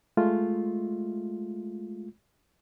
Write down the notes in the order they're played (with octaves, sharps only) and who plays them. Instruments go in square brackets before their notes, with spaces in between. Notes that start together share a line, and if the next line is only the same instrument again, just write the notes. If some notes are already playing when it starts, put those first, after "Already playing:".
[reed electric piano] G#3 A3 F4